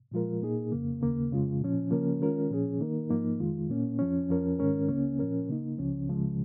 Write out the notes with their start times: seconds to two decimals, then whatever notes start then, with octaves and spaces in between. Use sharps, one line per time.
0.12 A#2 F3 G#3 F4 A#4
0.42 A#2 A#3 D#4 G#4
0.72 F2 C#3 A#3
1.01 D#2 C#3 A#3
1.31 F2 C#3 G#3 F4
1.61 A#2 F3 C#4
1.91 C#3 F3 A#3 C#4 A#4
2.20 D#3 G#3 C#4 F4 A#4
2.50 A#2 F3 C#4 G#4
2.80 D#3 A#3 D#4 A#4
3.10 G#2 F3 A#3 D#4
3.40 F2 D#3 G#3 F4
3.69 A#2 A#3 C#4
3.99 F2 F3 C#4
4.30 F2 F3 C#4 A#4
4.59 G#2 D#3 G#3 C#4 A#4
4.88 C#2 C#3 A#3 C#4
5.19 A#2 F3 C#4 A#4
5.49 C#3 A#3 D#4
5.78 C#2 C#3 F3 C#4
6.08 C#2 C#3 F3 G#3